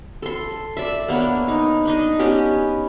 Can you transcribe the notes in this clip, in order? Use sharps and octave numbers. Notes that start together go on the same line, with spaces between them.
A4 C6
D5 E5
A#3 B3 D4 C#5
D#4
D4 D#4 D#5
B3 C#4 G4